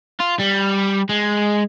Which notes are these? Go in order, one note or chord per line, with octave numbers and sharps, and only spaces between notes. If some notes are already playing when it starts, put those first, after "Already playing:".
F4
G3
G#3